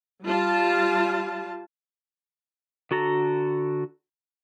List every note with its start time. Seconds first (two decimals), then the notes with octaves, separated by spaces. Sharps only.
0.23 G3 F4 A5
2.91 D3 F#4 A4 A#5